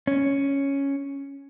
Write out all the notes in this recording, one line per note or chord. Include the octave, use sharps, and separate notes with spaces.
C#4